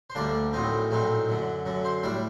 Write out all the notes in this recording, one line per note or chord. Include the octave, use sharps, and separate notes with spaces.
C5
D2 D3 G3 A#3 D4 D5
A#1 A2 F#3 C4 D#4
A#1 A2 F#3 C4 D#4
F#2 D3 F#3
F#2 D3 F#3
C5
A2 G3 D4 D5